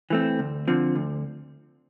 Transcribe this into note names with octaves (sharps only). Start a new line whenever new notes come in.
E3 A3 C4
D2
D3 F3 C4
D2